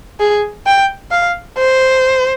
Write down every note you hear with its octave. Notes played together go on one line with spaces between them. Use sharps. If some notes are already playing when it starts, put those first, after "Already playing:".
G#4
G5
F5
C5